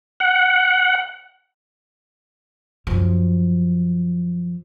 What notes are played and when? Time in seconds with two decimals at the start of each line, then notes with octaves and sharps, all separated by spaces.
0.20 F#5
2.87 F#2 F3